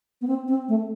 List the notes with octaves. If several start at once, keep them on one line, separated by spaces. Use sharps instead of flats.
B3
C4
C4
A3